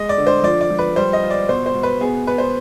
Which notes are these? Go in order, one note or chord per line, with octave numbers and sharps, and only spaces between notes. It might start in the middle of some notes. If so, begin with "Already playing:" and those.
Already playing: G#3 D#5
D5
D3
C5
F3 D5
D5
F3
B4
G3 C5
D#5
F4
D5
B2 C5
C5
B2
B4
B3 G#4
B3 B4
C5